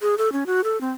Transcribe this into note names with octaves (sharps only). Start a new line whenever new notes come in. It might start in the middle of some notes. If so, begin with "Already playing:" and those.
G#4
A4
C#4
F#4
A4
C4